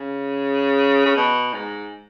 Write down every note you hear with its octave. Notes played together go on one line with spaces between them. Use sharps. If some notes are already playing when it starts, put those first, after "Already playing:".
Already playing: C#3
C#3
B2
G#2